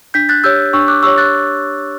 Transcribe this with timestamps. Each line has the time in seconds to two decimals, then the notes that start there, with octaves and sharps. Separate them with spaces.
0.14 D4 G6 B6
0.29 F#6 A6
0.44 G4 C#5 E6 G6
0.73 D4 C#6 E6
0.88 D6 F#6
1.03 G4 C#5 C#6 E6
1.18 F#6 A6